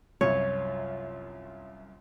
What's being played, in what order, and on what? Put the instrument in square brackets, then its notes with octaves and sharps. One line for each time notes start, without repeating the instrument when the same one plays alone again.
[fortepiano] C2 F#2 F4 [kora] C#5